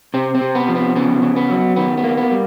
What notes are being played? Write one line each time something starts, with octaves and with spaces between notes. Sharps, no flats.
C3 C4
C4
C3
B3
F3
B3
C#3 B3
C#3
B3
F#3
D#3 B3
B3
A#3
B3
G3